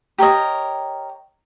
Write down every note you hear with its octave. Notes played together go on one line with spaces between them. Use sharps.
G4 A#4 C#5 D#5